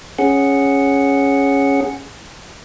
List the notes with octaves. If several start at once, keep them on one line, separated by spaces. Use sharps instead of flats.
C#4 G#4 F#5